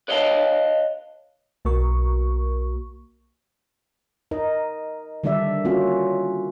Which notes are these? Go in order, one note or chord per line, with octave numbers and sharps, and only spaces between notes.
B4 C#5 D#5 F5 G#5 A5
B1 A#3 F#4 A#4 C#6
D#4 A#4 D#5
D3 D#3 G3 D4 D5 E5
A#3 C#4 F4 F#4